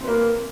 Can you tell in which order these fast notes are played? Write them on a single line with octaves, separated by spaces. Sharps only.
C4 B4 A#3